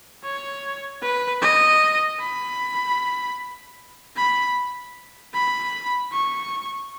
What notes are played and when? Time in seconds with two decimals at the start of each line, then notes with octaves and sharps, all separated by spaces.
0.24 C#5
1.02 B4
1.42 D#5
2.20 B5
4.17 B5
5.34 B5
6.12 C#6